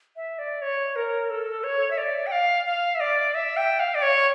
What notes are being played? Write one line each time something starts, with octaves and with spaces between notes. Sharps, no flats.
E5
D5
C#5
A#4
A4
C#5
E5
D5
G5
F5
F5
E5
D5
E5
G5
F5
D5
C#5